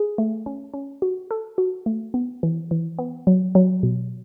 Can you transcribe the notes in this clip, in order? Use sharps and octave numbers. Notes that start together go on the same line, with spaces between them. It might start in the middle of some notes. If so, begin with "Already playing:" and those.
Already playing: G#4
A3
C#4
C#4
F#4
A4
F#4
A3
B3
E3
E3
B3
F#3
F#3
B2